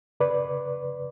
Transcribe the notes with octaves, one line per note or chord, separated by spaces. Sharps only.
C#3 B4 D5